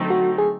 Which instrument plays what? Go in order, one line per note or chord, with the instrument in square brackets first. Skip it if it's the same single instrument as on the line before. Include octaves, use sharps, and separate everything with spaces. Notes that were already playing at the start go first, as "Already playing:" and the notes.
Already playing: [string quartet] D3 F#3 A3 C4 D#4
[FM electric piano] F#4
G#4